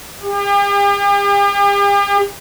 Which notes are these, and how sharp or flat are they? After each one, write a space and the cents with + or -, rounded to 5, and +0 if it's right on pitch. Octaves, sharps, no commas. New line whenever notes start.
G4 +40